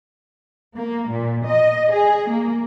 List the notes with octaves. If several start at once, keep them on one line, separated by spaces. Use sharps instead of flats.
A#3
A#2
D#5
G#4
A#3